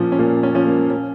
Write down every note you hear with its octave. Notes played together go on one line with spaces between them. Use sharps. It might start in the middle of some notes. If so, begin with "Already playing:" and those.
Already playing: A#2 F3 C#4
C#4
A#2 A#3
C#4
F3 C#4
A#3
C#4